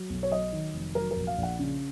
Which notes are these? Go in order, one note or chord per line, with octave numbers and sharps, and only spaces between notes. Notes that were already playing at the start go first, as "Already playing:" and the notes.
Already playing: F#3
B1
C#5
F#3 D#5
D#3
F1
F#3 A#4
A#4
A#1
F5
A#1
F#5
C#3